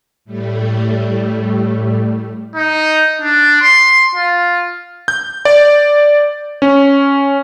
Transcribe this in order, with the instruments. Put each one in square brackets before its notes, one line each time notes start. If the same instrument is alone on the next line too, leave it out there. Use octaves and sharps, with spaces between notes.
[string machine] A2 G3 A3
[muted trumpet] D#4
D4
C6
F4
[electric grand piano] G6
D5
C#4